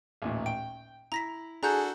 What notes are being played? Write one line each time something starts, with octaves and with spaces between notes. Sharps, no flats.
A1 D#2 A#2
G5 D7
E4 A#5 A#6 B6
D4 F#4 G#4 A4 A#5 F#6 G6